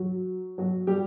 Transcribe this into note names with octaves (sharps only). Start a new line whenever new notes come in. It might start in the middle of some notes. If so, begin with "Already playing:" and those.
Already playing: F#3 F#4
F#3 F#4
G3 G4